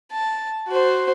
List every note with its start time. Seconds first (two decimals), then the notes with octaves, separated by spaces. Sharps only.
0.12 A5
0.68 F#4 C5